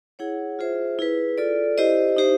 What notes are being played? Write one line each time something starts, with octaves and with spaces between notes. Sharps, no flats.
E4 G#4 C#5 F#5
F4 G#4 C5 E5
E4 G#4 B4
F4 A4 D5
E4 G4 C5 D#5
D#4 G4 C5 E5